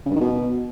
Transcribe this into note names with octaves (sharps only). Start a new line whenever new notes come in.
C#3
G2
D#3
B2